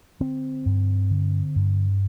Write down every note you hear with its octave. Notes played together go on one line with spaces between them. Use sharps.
D3 C4
G2
D3
G2